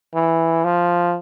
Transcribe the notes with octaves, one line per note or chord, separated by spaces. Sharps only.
E3
F3